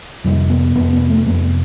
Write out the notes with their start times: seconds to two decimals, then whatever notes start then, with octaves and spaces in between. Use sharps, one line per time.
0.24 F2 C3 G3
0.50 B3
0.75 F2 C3 B3
0.93 B3
1.10 A3
1.26 F2 C3 B3